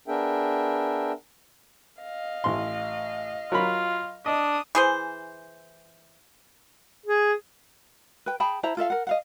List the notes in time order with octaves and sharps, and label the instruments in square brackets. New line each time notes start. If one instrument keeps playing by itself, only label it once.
[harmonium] B3 D4 G#4 A#4 E5 G5
[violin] D#5 F5
[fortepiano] A1 C6
[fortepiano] F#3 A#4 B5 [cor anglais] F4
[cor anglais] D4 [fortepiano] D#5 [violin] D#6
[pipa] E3 G#4 C5
[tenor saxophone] G#4
[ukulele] B4 G5
G#4 G5 A5 B5
E4 C5 A5 A#5
F4 A4 E5 F5
A#4 F#5
D#5 F5 F#5